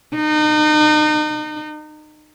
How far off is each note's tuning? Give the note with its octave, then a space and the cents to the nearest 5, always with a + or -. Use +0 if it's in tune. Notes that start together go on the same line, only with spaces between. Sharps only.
D#4 -35